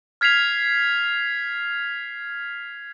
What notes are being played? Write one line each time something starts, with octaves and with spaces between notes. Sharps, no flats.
F6 G#6 B6 C7 F7